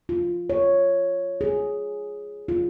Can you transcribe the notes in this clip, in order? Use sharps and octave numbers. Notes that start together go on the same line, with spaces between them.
F4
C#5
G#4
F4